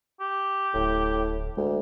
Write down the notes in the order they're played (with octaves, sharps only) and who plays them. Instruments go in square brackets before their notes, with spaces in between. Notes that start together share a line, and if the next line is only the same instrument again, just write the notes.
[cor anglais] G4
[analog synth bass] D1 [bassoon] A2
[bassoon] D2 [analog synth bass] G#3